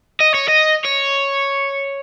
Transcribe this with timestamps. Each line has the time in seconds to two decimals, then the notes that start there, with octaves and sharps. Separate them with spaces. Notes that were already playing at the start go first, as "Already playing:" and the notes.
0.20 D#5
0.34 C#5
0.48 D#5
0.84 C#5